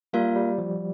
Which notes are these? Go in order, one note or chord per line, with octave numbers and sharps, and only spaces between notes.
G3 A#3 F4 A#4 F5
G3
F3